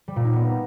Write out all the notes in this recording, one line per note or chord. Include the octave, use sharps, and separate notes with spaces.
G3
A#2
D#4
B3